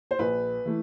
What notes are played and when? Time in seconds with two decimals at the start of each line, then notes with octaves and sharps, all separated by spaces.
0.11 C5
0.19 A#1 B4
0.66 E3 A3